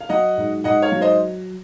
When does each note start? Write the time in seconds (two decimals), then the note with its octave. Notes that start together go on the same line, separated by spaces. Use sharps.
0.01 F5
0.09 F#3 D#5 F#5
0.37 G#2
0.64 G#2 D#5 F#5
0.82 C#5 F5
0.92 F#3
1.01 C5 D#5